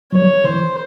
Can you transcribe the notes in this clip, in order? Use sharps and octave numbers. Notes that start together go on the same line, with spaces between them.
F#3 C#5
E3 C5